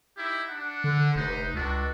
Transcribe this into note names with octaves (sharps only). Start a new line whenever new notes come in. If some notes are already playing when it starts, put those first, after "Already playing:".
D#4 E4 G4
D4 F#5
D3
F1 D#4 B4 C5
C#2 D4 F#4 A4